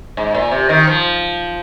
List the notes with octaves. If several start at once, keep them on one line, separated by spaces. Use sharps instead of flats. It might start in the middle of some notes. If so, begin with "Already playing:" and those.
G#2
A#2
C3
D#3
F3